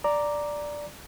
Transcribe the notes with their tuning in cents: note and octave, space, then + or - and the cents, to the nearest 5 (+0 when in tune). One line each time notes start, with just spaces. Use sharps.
D5 +0 A#5 +0 D6 +0